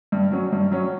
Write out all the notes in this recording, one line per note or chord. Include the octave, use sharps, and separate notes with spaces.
G2
F#3 C#4
G2
F#3 C#4